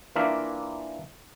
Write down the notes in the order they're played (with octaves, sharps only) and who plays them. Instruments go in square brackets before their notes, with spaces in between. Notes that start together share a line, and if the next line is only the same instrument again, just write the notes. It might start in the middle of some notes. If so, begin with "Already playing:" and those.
[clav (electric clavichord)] E3 A#3 D4 F4 A#4 E5